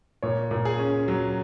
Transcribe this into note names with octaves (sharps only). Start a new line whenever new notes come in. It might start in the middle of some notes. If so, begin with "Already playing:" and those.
A#2 C#5
A#2
G#4
C#4
F#3